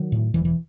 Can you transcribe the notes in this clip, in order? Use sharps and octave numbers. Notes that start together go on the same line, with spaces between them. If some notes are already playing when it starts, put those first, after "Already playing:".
Already playing: D#3 F#3
A2
E1 E3
E3